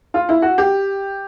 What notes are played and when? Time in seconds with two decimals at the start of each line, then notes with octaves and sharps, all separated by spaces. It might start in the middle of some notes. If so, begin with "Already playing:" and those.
0.14 F4
0.29 E4
0.42 F#4
0.58 G4